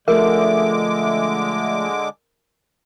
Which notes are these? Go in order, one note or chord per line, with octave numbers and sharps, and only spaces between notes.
D3 F3 G#3 A3 A#4 E5 D6